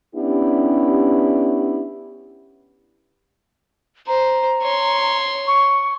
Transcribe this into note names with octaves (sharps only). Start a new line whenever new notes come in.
B3 C#4 D4 E4 G4
C5 A#5
C#5 C6
C#6